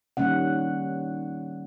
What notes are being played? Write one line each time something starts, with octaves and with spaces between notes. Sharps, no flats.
D#3 G3 A#3 C#4 F#5